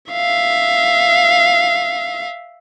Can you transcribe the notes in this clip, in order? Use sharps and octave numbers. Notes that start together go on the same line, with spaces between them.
E5 F5